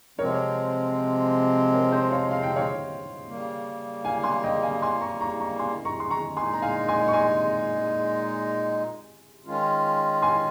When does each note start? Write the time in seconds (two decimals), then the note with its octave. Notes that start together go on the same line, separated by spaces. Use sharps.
0.19 C3 F3 G#3 C4 A#4 C#5
1.73 A#4 C#5
1.92 C5 D#5
2.12 C#5 F5
2.31 F5
2.43 G5
2.56 C#5 F5
3.27 C#3 G3 A#3
4.05 F5 G#5
4.24 G#5 C6
4.44 D#5 G5
4.63 F5 G#5
4.82 G#5 C6
5.01 A#5 C#6
5.20 A#5 C#6
5.40 A#5 C#6
5.59 G#5 C6
5.85 A#5 C#6
6.00 C6
6.10 A#5 C#6
6.36 A#2 G#3 D#4 G#5 C6
6.53 A#5
6.62 F5 G#5
6.88 G#5 C6
7.08 C#6
7.13 G#5 C6
9.46 D#3 G#3 C#4 F4
10.22 G#5 C6